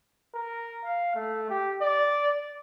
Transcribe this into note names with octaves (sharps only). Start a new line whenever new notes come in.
A#4
F5
A3
G4
D5